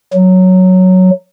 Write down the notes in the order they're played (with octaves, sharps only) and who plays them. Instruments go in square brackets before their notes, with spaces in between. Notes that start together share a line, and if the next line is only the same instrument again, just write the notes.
[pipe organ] F#3